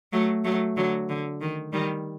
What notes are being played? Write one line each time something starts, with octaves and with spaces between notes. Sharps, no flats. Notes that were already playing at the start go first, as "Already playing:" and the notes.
F#3 A3
F#3 A3
D3 F#3
D3
D#3
D#3 G3